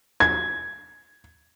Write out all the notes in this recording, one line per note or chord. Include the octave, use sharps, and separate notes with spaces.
G#6